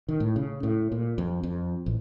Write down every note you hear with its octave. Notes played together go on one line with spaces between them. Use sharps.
D#3
A2
C#3
A2
A#2
F2
F2
A1